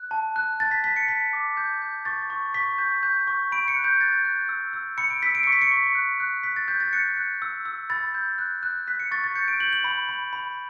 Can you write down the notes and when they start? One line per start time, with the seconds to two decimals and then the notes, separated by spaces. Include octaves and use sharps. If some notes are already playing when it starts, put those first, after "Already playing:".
Already playing: F#6
0.11 A5
0.36 F#6
0.60 A5 A6
0.71 B6
0.84 A5 B6
0.96 C#7
1.08 A5 B6
1.33 D6
1.57 G6
1.82 G6
2.05 C#6 A6
2.30 C#6
2.54 C#6 B6
2.78 G6
3.03 G6
3.27 C#6
3.52 B5 D7
3.68 C#7
3.76 F#6
3.84 G6
4.00 F#6 A6
4.25 F#6
4.49 E6
4.73 E6
4.98 B5 C#7
5.10 D7
5.23 E6 B6
5.35 D7
5.43 C#6 C#7
5.52 B6
5.61 C#7
5.71 C#6
5.95 F#6
6.20 F#6
6.43 F#6 B6
6.56 A6
6.68 F#6 G6
6.80 A6
6.93 F#6 C#7
7.17 F#6
7.42 E6
7.65 E6
7.90 B5 A6
8.15 G6
8.38 F#6
8.63 F#6
8.87 F#6 B6
9.00 C#7
9.11 C#6 A6
9.24 A6
9.35 G6 C#7
9.48 D7
9.60 G6 F#7
9.73 F#7
9.84 B5
10.09 B5
10.33 B5